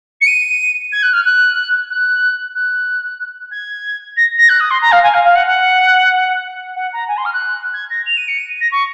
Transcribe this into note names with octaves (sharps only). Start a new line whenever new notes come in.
C#7
D#7
G#6
F#6
F6
F#6
F#6
F#6
G#6
A#6
A#6
F#6
D#6
C6
A#5
F5
G#5
F5
F5
F#5
F#5
F#5
A#5
G#5
C6
F6
F#6
G#6
A#6
F7
D#7
C#7
D#7
A#6
C#6